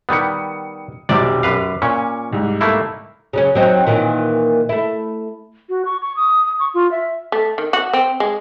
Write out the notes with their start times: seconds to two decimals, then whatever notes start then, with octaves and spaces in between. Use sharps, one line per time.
0.09 D#3 G3 B3 D#6 C#7
1.09 F1 B1 C3 D5 D6
1.43 F#2 B4 F5
1.82 A#2 C#4 C#6
2.33 C2 G#2
2.61 A3 A#3 E4
3.33 C#3 F#3 C#4
3.55 F#3 C4 D#4
3.86 A#2 D#3 E3
4.69 A3 E4
5.69 F#4
5.85 C#6
6.02 C#6
6.16 D#6
6.60 C#6
6.74 F4
6.91 E5
7.32 A3
7.58 D#3
7.73 F#4
7.93 C4
8.20 G#3